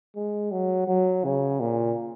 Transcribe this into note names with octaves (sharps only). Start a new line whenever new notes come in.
G#3
F#3
F#3
C#3
A#2